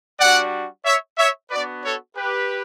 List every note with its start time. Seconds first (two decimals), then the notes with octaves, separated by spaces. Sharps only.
0.20 G3 D4 F#4 D5 F#5
0.85 C#5 E5
1.18 C#5 E5
1.50 B3 D4 F#4 B4 D5
1.83 A4 C#5
2.16 G4 B4